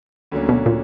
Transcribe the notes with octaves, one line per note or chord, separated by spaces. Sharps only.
D2 D3 F#3 A#3 C#4
B2
A#2